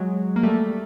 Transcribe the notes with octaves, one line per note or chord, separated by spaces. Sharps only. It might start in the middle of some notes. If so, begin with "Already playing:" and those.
Already playing: F#3 G#3
A#3
G3 A3